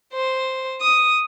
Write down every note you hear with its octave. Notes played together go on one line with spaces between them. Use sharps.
C5
D#6